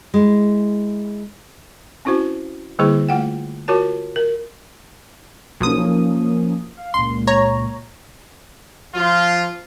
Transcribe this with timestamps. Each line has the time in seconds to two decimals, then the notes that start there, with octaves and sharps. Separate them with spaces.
0.14 G#3 E4
2.05 C4 C#4 E4 F#4 C5
2.79 D3 G3 A#3 E4 G#4 C5
3.09 A3 F4 F#5 G5
3.68 F4 F#4 A#4 C#5 A5
4.16 A#4
5.60 B1 F3 A#3 C#4 D#6
6.77 F5
6.94 C#2 A#2 C6
7.27 C#5 A#5
8.95 F3 F4